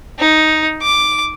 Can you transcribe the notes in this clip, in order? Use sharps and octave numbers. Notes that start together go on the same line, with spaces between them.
D#4
D6